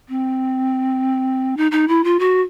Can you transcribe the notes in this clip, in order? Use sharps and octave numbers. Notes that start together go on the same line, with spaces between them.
C4
D#4
D#4
E4
F4
F#4